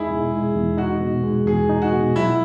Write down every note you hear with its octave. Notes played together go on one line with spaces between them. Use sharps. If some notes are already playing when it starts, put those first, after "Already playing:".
Already playing: E2 G#3 D#4 E4 G#4
B2
G#3
E2
D#4 F#4
B2
G#3
E2 G#4
D#4
F#4
B2
F#3 E4